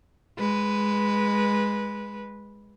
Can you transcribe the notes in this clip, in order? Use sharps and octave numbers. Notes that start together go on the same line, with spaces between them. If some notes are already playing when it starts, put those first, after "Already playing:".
G#3 B4